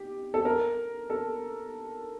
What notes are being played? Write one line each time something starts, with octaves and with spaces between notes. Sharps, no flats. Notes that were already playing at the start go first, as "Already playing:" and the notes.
Already playing: G4
A4
A#4
A4